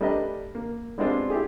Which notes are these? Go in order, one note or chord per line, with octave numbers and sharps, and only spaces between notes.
G3 A3 D4 A#4 B4 D#5
A#3
G3 G#3 B3 C4 D4 F4
E4 F4 G4 G#4